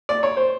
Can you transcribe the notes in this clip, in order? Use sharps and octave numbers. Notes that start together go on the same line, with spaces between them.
D5
C#5
C5